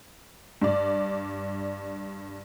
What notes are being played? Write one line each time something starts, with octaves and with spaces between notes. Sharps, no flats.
G2 D5